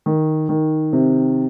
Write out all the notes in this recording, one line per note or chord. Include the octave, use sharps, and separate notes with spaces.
D#3
D#3
C3